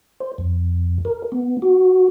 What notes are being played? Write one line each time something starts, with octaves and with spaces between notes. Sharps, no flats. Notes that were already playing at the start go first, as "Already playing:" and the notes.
C5
F2
A#4
B3
F#4